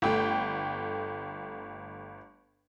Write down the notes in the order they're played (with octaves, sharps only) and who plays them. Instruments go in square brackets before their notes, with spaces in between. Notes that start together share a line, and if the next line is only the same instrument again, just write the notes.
[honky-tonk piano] G1 A3 G5